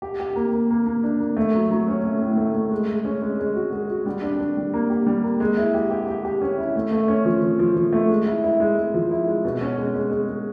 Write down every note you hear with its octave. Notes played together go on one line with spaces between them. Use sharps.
G4
G4
A#3
A#3
A#3
A#3
D4
A#3
A3
F#3
F#3
C#4
A3
A2
A3
A3
G#3
G#3
C#4
G#3
G#3
F#4
G#3
F#4
G3
D4
D4
G3
A#3
G4
G3
A#3
G#3
E4
G4
G4
G4
G4
C#4
E4
A3
A3
C#4
F3
F3
F3
F3
A3
G#3
E4
E4
G#3
G#3
F3
E4
G#3
B2
C#4
G#3
G#3
G#3
G#3